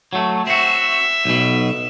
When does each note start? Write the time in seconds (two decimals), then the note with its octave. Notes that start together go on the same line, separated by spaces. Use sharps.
0.13 F#3 A3
0.47 C4 F#4 E5
1.25 B1 B2